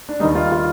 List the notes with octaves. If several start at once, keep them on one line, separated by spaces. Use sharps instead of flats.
D4
D#2 D#3 G3 D#4
F4
F4